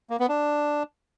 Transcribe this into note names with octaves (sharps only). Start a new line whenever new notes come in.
A#3
B3
D4